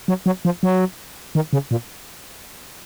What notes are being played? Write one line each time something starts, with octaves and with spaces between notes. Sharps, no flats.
F#3
F#3
F3
F#3
D#3
C#3
A#2